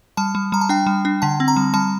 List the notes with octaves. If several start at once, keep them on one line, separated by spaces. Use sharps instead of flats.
G3 A5
G3
G3 A#5
A5
D4 G5
G3
D4
D3 A5
C4
A#5
G3
G3 A5